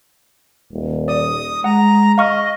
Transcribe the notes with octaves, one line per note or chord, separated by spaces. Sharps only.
D#1
D5 D#6
G#3 F#5 A#5
D#5 F5 C#6 F6